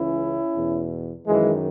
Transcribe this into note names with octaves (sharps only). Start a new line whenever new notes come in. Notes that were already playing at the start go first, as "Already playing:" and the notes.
Already playing: C#2 C#3 E3 C#4 E4
E2 B2
F#2 D#3 E3 G#3